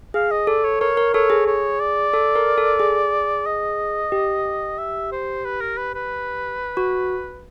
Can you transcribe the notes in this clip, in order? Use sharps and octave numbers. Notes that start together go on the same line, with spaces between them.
G#4 F5
D#5
A4 D5
C#5
A#4 C#5
A#4
A4 C#5
G#4
C#5
D5
A4
A#4
A4
G#4
D#5
G4
E5
C5
B4
A#4
B4
B4
F#4